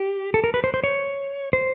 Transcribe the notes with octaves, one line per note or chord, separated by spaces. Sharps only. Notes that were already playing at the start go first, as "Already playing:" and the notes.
Already playing: G4
A4
A#4
B4
C5
C5
C#5
C5